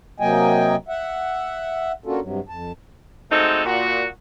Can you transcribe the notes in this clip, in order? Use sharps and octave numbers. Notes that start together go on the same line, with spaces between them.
C3 F#3 A#3 D#5 G5 G#5
E5 F#5
A#3 C#4 D4 F4 F#4 A4
G2 C3 F#3
F2 A5
G#3 A3 C4 D#4 F#4 A4
A#2 F#4